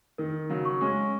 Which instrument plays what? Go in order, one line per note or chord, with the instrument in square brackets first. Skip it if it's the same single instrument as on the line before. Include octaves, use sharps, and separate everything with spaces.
[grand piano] D#3 [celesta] A#4
[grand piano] C#3 F#3
[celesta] C#6
[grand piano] G#3 C#4